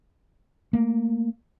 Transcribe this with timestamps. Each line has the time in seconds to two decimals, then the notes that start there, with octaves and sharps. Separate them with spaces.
0.73 A3 A#3